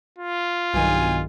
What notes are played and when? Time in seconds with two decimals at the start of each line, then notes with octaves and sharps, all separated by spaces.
0.19 F4
0.74 B1 G2 D#3 G#5